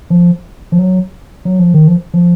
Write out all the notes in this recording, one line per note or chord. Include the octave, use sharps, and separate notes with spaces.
F3
F3
F#3
F#3
F3
D#3
F3
F3